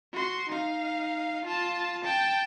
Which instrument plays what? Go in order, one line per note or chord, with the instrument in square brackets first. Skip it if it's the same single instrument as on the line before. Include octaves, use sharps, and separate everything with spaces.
[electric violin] F#4 C6
D#4 F5
F4 A5
G5 A5